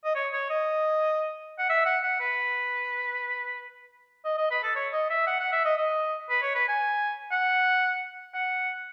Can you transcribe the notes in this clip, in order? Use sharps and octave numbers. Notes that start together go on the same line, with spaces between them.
D#5
C#5
C#5
D#5
F#5
E5
F#5
F#5
B4
D#5
D#5
B4
A4
C#5
D#5
E5
F#5
F#5
E5
D#5
D#5
B4
C#5
B4
G#5
F#5
F#5